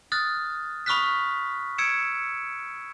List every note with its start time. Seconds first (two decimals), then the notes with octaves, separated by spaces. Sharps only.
0.12 D#6 F6 F#6 A6
0.86 B5 C#6 D#6 F6 F#6 B6
1.78 E6 G#6 C#7 D7 E7